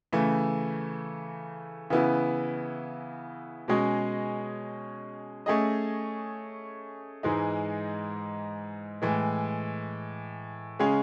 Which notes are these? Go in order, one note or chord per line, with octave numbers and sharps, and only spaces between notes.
C#3 E3 A3
C#3 E3 B3 E4
B2 G#3 C#4 G#4 D#5
A3 C#4 G#4 D#5
G#2 E3 G#3 D#4
A2 E3 G#3
C#3 G#3 C#4 G#4